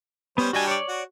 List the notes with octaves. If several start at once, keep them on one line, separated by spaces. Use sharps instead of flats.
G3 B3 C#4 C5
G3 D4 F#4 D#5 G5 G#5
C#5 D5
F#4